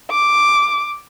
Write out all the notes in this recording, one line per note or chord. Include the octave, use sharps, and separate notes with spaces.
D6